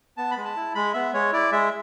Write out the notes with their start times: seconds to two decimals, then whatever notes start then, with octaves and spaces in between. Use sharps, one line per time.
0.17 B3 A5
0.31 B5
0.37 G#3
0.45 A5
0.56 E4
0.75 G#3 B5
0.94 B3 E5
1.13 G#3 C#5
1.32 E4 D5
1.51 G#3 E5